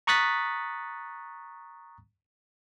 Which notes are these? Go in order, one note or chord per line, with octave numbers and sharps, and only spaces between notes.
A#5 C#6 D#6 F#6 A6 B6